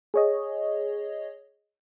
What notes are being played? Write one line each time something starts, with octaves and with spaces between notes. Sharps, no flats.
G#4 C#5 D#5